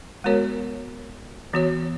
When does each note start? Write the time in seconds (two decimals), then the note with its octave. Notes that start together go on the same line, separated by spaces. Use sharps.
0.24 G#3 B3 F#4 A#4 C#5
1.53 E3 B3 F#4 C#5